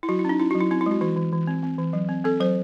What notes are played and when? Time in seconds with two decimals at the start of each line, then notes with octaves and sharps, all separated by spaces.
0.03 E4
0.09 F#3 F#4
0.19 E4
0.25 C#4 D#4
0.39 C#4 E4
0.51 F#4
0.55 F#3
0.60 E4
0.71 C4 E4
0.81 E4
0.86 G#3 F#4
1.01 E3 F#4
1.17 E3
1.33 E3
1.47 C4
1.63 C4
1.78 E3
1.93 F#3
2.09 C4
2.24 C4 A4
2.40 F#3 C5